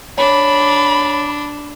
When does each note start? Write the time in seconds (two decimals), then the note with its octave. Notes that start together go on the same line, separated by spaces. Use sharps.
0.18 D4 C#5 B5